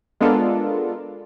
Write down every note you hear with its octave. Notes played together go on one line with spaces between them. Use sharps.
G#3 B3 D4 F4 A4 A#4